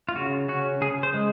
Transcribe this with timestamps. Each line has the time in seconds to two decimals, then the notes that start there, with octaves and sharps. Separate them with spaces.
0.09 F4
0.16 C#3 F#4
0.48 C#4 F#4
0.81 C#3 G#4
1.03 C5
1.14 G#3